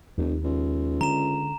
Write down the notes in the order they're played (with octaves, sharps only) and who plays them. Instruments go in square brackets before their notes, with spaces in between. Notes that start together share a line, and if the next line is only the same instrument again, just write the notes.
[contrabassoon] F1 [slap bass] D#2
[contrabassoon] C#2
[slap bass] D3 [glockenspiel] A#5 E7